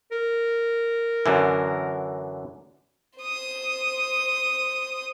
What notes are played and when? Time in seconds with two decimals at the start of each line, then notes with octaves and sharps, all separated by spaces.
0.11 A#4
1.26 F#2 D3 E3
3.18 C5 D#6